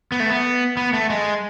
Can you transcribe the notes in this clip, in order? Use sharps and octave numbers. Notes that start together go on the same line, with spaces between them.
B3
A3
B3
B3
A3
G#3